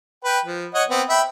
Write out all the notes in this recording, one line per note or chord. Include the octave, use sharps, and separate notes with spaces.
B4 G5
F3
C#5 D#5 F#5
B3 C4
E5 G5 B5